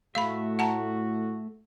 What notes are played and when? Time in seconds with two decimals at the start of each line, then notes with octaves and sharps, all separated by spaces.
0.15 A2 A3 F#4 E5 F5 B5
0.59 F#5 A5 A#5